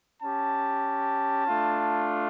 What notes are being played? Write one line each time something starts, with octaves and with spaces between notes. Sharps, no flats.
C#4 G4 A5
A3 D4 F4